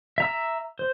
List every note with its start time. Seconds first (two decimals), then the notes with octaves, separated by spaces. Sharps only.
0.18 E5 A#5 E6
0.79 C5